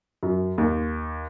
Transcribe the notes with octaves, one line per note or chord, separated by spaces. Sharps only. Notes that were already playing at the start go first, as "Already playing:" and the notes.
F#2
D#2